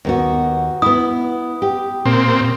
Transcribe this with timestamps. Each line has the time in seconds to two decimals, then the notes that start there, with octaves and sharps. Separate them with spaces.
0.05 D#2 B3 F#4
0.82 B3 E4 D#6
1.62 G4
2.05 A#2 C4